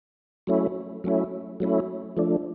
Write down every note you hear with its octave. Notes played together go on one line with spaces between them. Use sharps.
F#3 A3 C#4 E4
F#3 A3 C#4 E4
F#3 A3 C#4 E4
F3 A3 D4